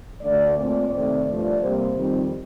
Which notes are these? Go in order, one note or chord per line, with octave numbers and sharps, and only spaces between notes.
D2 D3 A3 D5
A#2 A3 C4 D5
C3 D#3 A3 C4 D5
G2 F3 A3 D5
C3 G3 A#3 C5
F2 D#3 G3 C4